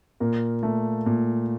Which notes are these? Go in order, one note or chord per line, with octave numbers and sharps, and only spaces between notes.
A#2 A#4
A3
A#2